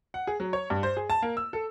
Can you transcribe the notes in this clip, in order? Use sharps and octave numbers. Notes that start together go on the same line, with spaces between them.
F#5
G#4
F#3
C#5
G2
C5
G#4
A5
A#3
E6
A4